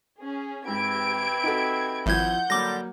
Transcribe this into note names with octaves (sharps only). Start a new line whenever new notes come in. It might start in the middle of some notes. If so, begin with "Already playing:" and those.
C#4 G#4
G#2 E3 C4 G4 B5 G#6 D7
D#4 F#4 A4
G#1 F3 E4 F#5 G6 G#6
D3 F#3 G3 A#3 D6 A#6